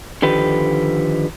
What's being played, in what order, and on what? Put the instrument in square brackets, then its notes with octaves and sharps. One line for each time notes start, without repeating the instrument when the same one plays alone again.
[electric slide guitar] D3 D#3 F3 G4 B4